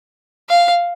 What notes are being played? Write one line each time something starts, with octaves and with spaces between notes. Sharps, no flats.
F5